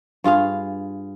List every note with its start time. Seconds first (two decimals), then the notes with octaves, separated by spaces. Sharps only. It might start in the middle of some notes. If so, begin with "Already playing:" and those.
0.24 G2 F4 G#4 F5